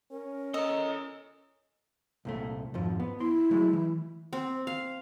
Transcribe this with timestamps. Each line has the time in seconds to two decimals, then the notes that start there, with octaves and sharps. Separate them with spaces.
0.11 C#4 A#4
0.54 A4 D#5 A#5
2.25 C2 A#2 A3
2.74 F2 G#2 F3
3.00 B3
3.20 E4 C6
3.51 F#3 G#3 A3
3.73 E3
4.33 C4
4.67 F5